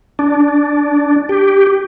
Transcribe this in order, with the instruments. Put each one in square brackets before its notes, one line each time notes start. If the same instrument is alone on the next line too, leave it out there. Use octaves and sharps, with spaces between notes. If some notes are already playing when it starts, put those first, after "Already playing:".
[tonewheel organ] D4
G4